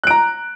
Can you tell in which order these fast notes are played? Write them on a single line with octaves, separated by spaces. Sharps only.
F#6 D7 A#5